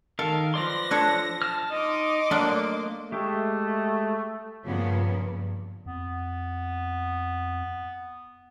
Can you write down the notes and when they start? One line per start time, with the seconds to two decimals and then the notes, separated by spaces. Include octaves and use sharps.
0.19 D#3 A4 A#4 F5
0.54 F3 B4 D5 C6 A#6
0.91 D4 A4 C#5 F#6
1.42 A5 F6
1.72 D#4 D#5 C6 D6
2.31 F#3 A3 A#3 D4 A#4
3.12 G#3 A3 G4 E5
4.64 G2 A#2 C#3 F3 A#3 B3
5.14 G2
5.86 F2 B3